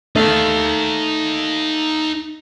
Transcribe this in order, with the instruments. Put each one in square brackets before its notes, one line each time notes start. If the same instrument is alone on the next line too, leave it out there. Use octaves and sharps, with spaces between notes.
[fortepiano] A3 [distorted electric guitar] D#4 F5